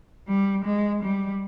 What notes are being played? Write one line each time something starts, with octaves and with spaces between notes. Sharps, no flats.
G3
G#3
G3